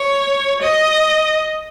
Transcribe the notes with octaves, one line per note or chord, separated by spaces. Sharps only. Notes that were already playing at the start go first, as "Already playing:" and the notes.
Already playing: C#5
D#5